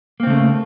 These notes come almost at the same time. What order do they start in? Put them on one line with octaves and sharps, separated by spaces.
A#3 C4 C#3 A3